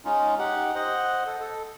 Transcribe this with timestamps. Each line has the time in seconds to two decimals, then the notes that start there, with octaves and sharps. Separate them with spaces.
0.05 G#3 C#4 D#4 F4
0.39 D#4 G4 F#5
0.75 C5 D#5 F#5
1.26 A4
1.40 A4